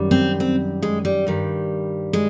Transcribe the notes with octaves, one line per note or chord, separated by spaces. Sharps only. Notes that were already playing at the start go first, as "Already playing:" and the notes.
Already playing: F#2 D#3 G3
C4
C4
G#3
G3
G2 D#3 G3
G#3